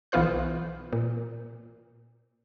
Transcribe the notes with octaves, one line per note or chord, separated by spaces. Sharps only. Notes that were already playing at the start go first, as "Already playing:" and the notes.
B1 E3 B3 F4 C5 F#6
A#2